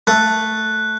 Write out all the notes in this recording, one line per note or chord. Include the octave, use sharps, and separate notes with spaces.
A3 F#6